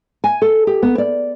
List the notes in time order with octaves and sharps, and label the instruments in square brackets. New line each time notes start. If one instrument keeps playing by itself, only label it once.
[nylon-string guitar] G#5
A4
G4
B3
D5